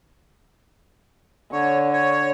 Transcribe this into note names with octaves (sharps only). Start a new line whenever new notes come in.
D3 C#5
C#5